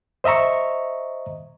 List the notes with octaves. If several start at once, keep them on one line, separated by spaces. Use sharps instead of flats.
C5 D#5 E5 A#5 C#6